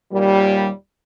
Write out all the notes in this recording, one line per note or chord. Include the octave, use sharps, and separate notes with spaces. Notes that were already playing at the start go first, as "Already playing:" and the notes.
D#2 A#2 G3